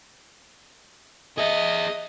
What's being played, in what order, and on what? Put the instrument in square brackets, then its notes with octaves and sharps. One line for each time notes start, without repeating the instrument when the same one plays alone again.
[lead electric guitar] G#4 E5 [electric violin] D#5